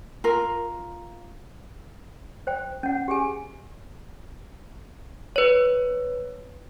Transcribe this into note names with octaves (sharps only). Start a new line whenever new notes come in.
F4 A#4
C5 G5
C#4 F#5
G4 G#4 G#5
B4 C#5